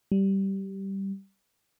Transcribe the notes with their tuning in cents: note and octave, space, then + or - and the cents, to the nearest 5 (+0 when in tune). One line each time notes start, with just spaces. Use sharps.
G3 -10